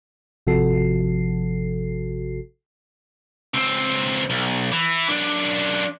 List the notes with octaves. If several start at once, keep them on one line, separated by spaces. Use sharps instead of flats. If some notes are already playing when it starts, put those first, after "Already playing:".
G#1 C3 F3 F#4 A4 C7
C#2 C4
B1
E3
F#2 D4